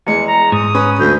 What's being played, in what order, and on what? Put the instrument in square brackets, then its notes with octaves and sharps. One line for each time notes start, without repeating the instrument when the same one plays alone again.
[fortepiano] E2 G#3 [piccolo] C#7
[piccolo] A#5
[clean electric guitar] G#2 [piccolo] D#6
[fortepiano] C#4 B4
[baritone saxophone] D2 [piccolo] G6